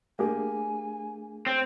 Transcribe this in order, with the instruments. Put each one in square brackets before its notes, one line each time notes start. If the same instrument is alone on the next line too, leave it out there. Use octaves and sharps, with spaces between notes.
[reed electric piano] A3 D4 G#4 [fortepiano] A#3 G4 [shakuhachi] G#5
[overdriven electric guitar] C4